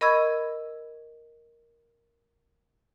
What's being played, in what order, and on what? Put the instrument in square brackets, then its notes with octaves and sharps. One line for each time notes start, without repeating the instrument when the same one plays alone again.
[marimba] A#4 D#5 B5 C#6 E6 G#6